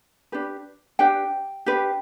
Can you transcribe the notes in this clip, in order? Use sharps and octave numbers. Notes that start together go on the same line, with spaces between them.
D4 G4 B4
D4 G4 B4 G5
D4 G4 B4